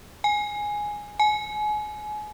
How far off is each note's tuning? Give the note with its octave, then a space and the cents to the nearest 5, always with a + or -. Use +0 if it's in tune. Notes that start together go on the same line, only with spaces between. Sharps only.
G#5 +0
G#5 +30